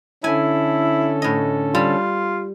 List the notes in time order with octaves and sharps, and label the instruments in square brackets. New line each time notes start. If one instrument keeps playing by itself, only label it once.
[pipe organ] D3 C#4 A4 [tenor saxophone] E4 [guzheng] G#5
[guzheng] A2 D#5
[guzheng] G3 [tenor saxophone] F4